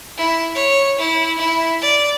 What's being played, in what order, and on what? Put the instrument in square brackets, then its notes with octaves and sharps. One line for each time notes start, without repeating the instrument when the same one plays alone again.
[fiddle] E4
C#5
E4
E4
D5